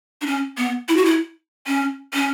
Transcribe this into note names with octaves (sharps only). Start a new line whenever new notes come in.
D4
C#4
B3
E4
F#4
E4
C#4
C#4